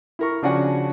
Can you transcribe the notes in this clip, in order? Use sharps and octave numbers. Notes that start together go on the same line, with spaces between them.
E4 A#4 C#6
C#3 F3 D4 F#4 F#5 G#5